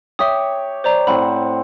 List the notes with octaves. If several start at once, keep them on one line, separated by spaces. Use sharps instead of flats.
G4 C#5 E5 D#6
C5 D5 A#5
A2 C4 F#5 B5